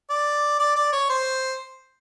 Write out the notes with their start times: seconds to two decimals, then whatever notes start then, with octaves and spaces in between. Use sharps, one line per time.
0.10 D5
0.59 D5
0.76 D5
0.93 C#5
1.10 C5